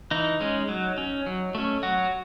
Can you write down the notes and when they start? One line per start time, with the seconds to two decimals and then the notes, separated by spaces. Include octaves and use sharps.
0.11 E3 D#4
0.40 G#3 C#4
0.69 F#3
0.98 C#4
1.26 F#3
1.55 A3 C#4
1.83 F#3 F#4